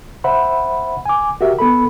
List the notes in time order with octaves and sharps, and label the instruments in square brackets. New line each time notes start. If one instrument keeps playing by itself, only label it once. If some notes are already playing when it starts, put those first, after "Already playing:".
[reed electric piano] C5 E5 F#5 B5
G#5 D6
F#4 G4 A#4 E5
B3 A4 B5